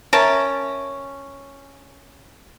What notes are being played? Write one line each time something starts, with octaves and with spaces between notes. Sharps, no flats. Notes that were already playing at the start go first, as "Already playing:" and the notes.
C#4 A#4 E5 A5